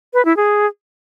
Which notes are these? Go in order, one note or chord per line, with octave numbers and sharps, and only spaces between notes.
B4
E4
G#4